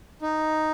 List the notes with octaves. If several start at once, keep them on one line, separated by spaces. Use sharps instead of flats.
D#4